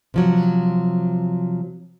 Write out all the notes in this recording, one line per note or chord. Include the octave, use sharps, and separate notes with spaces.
C3 F3 F#3